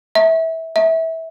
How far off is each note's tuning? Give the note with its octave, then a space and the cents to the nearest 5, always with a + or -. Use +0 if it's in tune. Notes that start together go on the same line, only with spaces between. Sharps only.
E5 -20
E5 -20